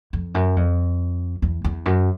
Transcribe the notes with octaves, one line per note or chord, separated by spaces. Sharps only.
F2
F#2
F2
E2
E2
F#2